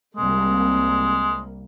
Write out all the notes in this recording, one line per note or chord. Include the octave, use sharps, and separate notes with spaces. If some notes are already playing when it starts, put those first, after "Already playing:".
C2 G#3 A#3